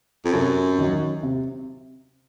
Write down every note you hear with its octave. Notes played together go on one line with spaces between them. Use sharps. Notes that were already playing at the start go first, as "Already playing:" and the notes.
F2
F#2 C3
D#3 F#3
C3